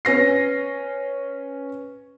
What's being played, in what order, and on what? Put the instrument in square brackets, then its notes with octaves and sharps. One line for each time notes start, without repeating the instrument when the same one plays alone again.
[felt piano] C#4 B4 A#6 C7